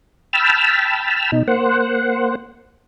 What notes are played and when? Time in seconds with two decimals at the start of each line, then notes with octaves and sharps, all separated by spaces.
0.33 G5 A5 B5 E6 F6
1.32 B2 D#4
1.48 A#3 C5 F#5